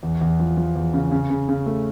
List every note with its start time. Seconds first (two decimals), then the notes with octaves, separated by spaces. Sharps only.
0.03 E2
0.21 E2
0.40 F3
0.57 F3
0.76 E2
0.94 C#3
1.12 C#3
1.30 C#3
1.49 C#3
1.66 A3